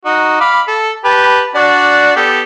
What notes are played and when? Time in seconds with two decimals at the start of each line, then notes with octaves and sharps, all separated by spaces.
0.05 D#4 F#4
0.40 F5 B5 D6
0.68 A4
1.04 G4 B4 A5
1.55 D4 F#4 D5
2.16 B3 G4 A4